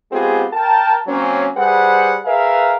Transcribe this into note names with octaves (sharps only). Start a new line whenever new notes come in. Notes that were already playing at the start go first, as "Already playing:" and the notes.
G#3 B3 C4 F4 G4 G#4
A#4 G5 A5
F#3 A#3 C4 C#4
G3 G#4 B4 C5 F#5
G#4 A#4 B4 E5 F5